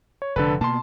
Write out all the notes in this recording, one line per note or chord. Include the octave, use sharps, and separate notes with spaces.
C#5
F1 D3 A4 B4
B2 A#3 B3 A5 C6